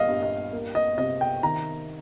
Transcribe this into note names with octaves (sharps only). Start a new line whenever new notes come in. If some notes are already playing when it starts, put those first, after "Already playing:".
Already playing: A#2 G3 D#5 F5
G2
D#5
A#3
D#5
C3 D#5
G5
D#3 A#5